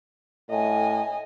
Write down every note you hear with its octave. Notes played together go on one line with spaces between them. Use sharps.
A2 D#5 G#5